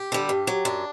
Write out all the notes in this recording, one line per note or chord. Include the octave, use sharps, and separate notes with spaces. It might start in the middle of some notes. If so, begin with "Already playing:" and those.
Already playing: G4
D3 G3
G2
F#3
F#2 D4